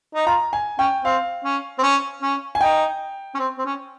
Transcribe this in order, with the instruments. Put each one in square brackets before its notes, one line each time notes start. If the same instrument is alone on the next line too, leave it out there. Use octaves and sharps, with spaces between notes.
[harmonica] D#4
[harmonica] F4 [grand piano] A#5
[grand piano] G#5
[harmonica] C#4 [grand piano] G5
[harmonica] C4 [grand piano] F5
[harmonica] C#4
C4
C#4
C#4
[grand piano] G#5
[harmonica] D#4 [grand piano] G5
[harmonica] C#4
C4
C4
C#4